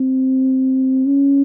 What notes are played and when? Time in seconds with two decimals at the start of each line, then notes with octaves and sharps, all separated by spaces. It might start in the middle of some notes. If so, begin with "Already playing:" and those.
Already playing: C4
1.06 C#4